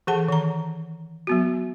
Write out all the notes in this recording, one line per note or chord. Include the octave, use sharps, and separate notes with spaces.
E3 G#4 A4 F#5 A5
D#3 A#5
F#3 B3 F#4